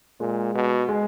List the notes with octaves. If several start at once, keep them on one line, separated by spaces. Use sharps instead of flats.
A#2 G#3
B2
G#3